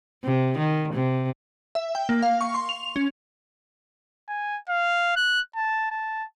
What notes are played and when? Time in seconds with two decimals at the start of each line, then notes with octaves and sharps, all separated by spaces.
0.24 C3
0.58 D#3
0.94 C3
1.75 E5
1.95 G5
2.09 A#3
2.23 F5
2.41 C#6
2.54 C6
2.69 F7
2.96 C#4
4.29 G#5
4.69 F5
5.16 F#6
5.55 A5
5.91 A5